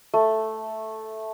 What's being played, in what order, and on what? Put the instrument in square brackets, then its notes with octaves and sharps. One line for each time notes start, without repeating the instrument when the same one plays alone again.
[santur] A3